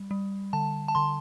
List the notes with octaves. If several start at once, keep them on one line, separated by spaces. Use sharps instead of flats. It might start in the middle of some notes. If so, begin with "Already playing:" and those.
Already playing: G3
G3
D3 A5
A5
D3 C6